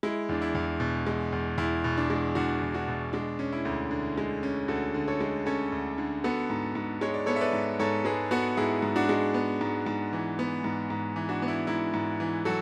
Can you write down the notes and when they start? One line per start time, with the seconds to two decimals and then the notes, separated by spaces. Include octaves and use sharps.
0.03 G#3 E4
0.29 E2 D4
0.42 E4
0.55 E2
0.80 B2
1.07 G#3
1.32 E2
1.58 E2 E4
1.84 B2
1.97 D4
2.10 G#3
2.35 E2 D4 F#4
2.61 E2
2.74 D4 F#4
2.88 B2
3.13 G#3 D4
3.39 C#4
3.52 E4
3.65 D2
3.91 D3
4.18 G#3
4.43 C#4
4.68 D2 F#4 A4
4.94 D3
5.07 A4 C#5
5.20 G#3
5.46 C#4 A4 C#5
5.72 D2
5.98 D3
6.24 B3 F#4 A4
6.50 G#2
6.75 G#2
7.01 G#3 C#5
7.14 D5
7.26 B3 A4 C#5
7.36 E5
7.40 B4 D5
7.53 G#2
7.80 G#2 A4 C#5
8.05 G#3 G#4 B4
8.31 B3 F#4 A4
8.57 G#2 E4 G#4
8.82 G#2
8.96 D4 F#4
9.09 G#3
9.34 B3
9.61 G#2
9.86 G#2
10.13 E3
10.39 B3
10.64 G#2
10.90 G#2
11.16 E3
11.29 D4 F#4
11.42 B3
11.48 E4
11.67 G#2 E4
11.94 G#2
12.20 E3
12.45 F#3 F#4 A4